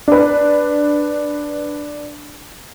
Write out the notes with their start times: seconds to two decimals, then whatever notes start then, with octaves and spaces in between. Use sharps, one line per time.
0.08 D4 B4